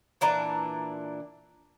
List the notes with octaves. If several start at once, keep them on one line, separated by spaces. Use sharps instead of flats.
A#2 E3 D4 A#5